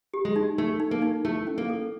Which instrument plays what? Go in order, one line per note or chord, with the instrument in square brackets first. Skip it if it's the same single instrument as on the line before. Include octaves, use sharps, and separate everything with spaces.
[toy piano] G4
[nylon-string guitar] G#3
[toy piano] D#4
[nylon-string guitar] A3 [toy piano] D#4
[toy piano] D#4
[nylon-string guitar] A#3
[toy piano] D#4
[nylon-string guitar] A3 [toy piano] E4
[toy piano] C#4
[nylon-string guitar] A#3
[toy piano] A4